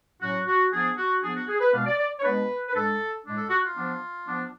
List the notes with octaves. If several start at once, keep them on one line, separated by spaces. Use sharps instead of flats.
A2 F#3 C#4 F#4
F#4
F3 B3 D4 G#4
F#4
F3 B3 D4 G#4
F#4
G#4
B4
B2 G#3 B3 D4 F5
D5
D5
C#5
B2 G#3 B3 D4 B4
B4
A2 G#3 D4 A4
A2 G#3 D4
A4
F#4
F4
F3 B3 D4
F3 B3 D4